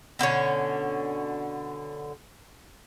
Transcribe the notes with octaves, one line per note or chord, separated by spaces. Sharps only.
B2 D3 C#4 C#5